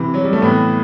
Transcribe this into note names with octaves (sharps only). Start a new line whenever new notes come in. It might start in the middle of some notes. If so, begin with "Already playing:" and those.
Already playing: C3 E3
F#3
G3
A3
A2 E3 B3